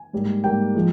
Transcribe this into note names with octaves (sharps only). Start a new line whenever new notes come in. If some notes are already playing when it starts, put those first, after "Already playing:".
Already playing: G#5
G#2 G3 A#3
G#2 G3 A#3 G5
F3 G#3